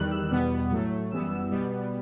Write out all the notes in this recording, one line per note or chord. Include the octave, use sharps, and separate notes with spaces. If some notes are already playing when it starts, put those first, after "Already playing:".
Already playing: E2 D#3 G3 F#6
E6
E2 B2 G3 B3
A2 F#3 A3
F#2 E3 G3 B3 E6
E6
B2 G3 B3